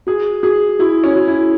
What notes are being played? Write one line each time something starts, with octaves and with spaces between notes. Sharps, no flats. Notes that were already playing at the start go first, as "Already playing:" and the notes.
F#4 G#4
F#4 G#4
E4 F#4
C#4
F#4
E4